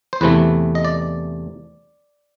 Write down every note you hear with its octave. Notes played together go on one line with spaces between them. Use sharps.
C5
E2 C3 E3 A3 B4
D#5
D5